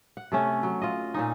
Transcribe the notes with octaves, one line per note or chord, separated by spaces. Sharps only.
F#5
C3 A3 C#4
F#3
F4 D#5
A#2 C#4 D#4